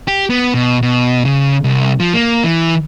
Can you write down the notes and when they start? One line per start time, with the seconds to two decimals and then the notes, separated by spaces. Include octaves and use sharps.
0.08 G4
0.30 B3
0.54 B2
0.82 B2
1.25 C#3
1.64 C2
2.00 F3
2.14 A#3
2.44 E3